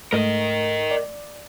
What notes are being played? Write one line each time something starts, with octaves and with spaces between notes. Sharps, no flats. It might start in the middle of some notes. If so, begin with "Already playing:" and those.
G#2 A3 A#4 D#5
D5